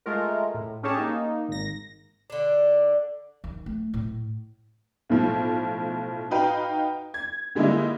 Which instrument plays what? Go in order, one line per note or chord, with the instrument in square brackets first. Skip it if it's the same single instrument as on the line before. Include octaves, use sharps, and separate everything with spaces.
[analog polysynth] G#3 A3 F4 A#4
A2
C#4 G4 G#4 C#5 A5
A#3 D#4
G#1 A#6
[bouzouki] D3 D4
[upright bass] D#3
A3
A2
[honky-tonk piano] B1 A2 F3
D#4 F#4 B4 F5 G5 A#5
G#6
D3 G3 G#3 A#3 D#4 E4